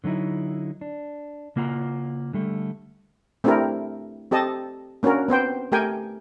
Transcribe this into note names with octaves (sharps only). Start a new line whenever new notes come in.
D3 F#3 A3 D#4 E4
D4
C#3 A#3 F4 F#5 A#5
D3 G3 A3
A3 C4 D4 E4 G4 A#4
C4 G4 A4 D#5 A5
A#3 C#4 D4 F#4 A#4
B3 C4 C5 G5
A3 G4 A#4 G5 G#5